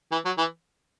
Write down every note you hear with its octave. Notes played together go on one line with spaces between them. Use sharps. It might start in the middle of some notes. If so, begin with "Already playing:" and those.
E3
F#3
E3